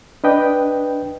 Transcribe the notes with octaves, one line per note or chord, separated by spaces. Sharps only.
D4 B4 D#5 G5